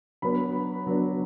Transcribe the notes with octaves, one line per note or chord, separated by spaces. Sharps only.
F#3 B3 D4 B5
F#3 B3 D4